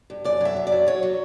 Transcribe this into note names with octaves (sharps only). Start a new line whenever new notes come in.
G2
F#2 D5
F#3 E5
F#2
D5
F#3
F#3 C#5
F#3